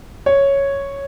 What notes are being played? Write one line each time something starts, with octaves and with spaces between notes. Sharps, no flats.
C#5